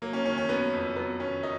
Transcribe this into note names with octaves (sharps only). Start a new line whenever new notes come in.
F#3 A#3
C#4
D#3 C#4
C#4
F#3 B3
F2
F#3 B3
D#3 C#4
D#3 D#4